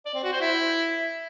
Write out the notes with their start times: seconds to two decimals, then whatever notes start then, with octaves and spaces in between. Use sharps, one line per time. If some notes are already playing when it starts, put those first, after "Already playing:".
0.06 D5
0.15 C4
0.23 F#4
0.32 C5
0.41 E4